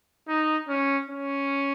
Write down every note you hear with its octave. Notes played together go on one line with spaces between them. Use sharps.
D#4
C#4
C#4